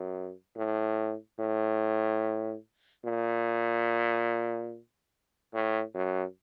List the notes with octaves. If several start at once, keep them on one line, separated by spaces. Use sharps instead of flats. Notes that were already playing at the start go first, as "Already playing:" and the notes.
Already playing: F#2
A2
A2
A#2
A2
F#2